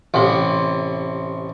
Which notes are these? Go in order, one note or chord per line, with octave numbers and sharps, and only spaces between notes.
A1 C3